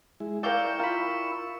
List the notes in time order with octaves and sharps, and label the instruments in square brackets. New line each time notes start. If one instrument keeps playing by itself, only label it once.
[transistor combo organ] G#3 E4
[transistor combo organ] E4 C#6 E6 [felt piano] A#4 F5 G5 [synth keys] D5 G6
[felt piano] F4 [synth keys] A#4 B5